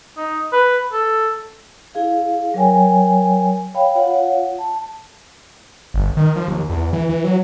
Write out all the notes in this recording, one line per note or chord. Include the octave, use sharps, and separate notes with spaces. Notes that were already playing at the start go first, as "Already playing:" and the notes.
D#4
B4
A4
E4 G#4 F5
F#3 A#4 C#5 G5 G#5
C#5 F5 G5 B5
F4 C#5 F5 F#5
A5
G1
D#3
F3
D#2
E2
E3
E3
F#3